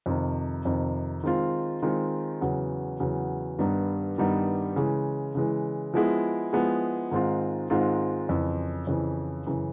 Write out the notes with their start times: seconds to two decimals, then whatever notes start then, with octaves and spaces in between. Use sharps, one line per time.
0.06 F2 C3 D#3
0.65 F2 C3 D#3
1.23 D#3 G#3 C4 F4
1.82 D#3 G#3 C4 F4
2.41 E2 C#3 F#3
3.00 E2 C#3 F#3
3.59 G2 D#3 G3 B3 D#4
4.18 G2 D#3 G3 B3 D#4
4.76 C#3 E3 G#3
5.35 C#3 E3 G#3
5.94 F3 G#3 B3 E4 G#4
6.53 F3 G#3 B3 E4 G#4
7.11 G#2 D#3 G#3 C4 F4
7.70 G#2 D#3 G#3 C4 F4
8.29 F2 C#3 E3
8.87 F2 C#3 E3
9.46 F#2 C#3 E3